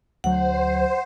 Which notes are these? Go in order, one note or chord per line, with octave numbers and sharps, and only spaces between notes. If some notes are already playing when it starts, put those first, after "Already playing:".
D2 F#3 C5 F#5